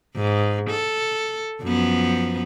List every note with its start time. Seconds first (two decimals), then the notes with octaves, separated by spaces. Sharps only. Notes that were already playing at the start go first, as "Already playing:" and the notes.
0.16 G#2
0.70 A4
1.63 F#2 F3 B3